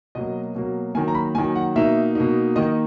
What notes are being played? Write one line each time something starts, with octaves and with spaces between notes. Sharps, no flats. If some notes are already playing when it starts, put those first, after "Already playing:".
B2 F#3 A#3 D#5
B2 F#3 A#3
D#3 F#3 A#3 G#5
A#5
B5
D#3 F#3 A#3 G#5
F#5
B2 A#3 D#4 E5
B2 A#3 D#4
D#3 A#3 D#4 D#5